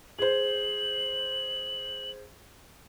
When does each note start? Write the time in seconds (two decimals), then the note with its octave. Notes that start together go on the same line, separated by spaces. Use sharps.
0.19 G#4 C5 F#7